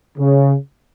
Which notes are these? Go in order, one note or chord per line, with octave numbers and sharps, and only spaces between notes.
C#3